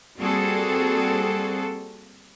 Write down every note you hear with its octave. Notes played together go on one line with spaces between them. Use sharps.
G3 A#3 C4 F#4 G#4 A4